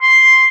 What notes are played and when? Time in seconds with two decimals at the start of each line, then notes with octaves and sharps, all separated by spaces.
0.01 C6